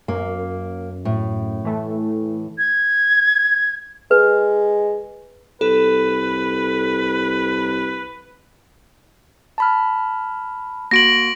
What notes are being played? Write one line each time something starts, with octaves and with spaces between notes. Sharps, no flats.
F#2 A#3
A2
E3 A3
G#6
G#3 B4
C2 A4 B4
A5 B5 F6
A#3 F#4 C6 A#6 D7 F#7